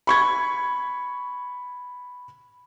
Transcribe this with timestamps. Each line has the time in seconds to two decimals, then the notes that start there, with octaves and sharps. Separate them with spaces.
0.07 B5 C#6 G#6